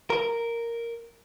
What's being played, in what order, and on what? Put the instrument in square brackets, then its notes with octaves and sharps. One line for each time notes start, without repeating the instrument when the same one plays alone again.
[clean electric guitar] A#4